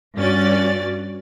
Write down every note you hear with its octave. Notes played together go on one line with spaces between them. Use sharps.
G2 C#4 F#4 D5 A6